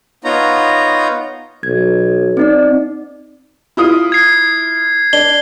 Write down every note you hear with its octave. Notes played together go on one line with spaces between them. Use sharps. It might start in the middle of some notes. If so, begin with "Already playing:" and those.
B3 D#4 F4 C#5 A#5
B1 G#6
C4 D#4 D5
E4 F4 D#6
G#6 C7
D4 G7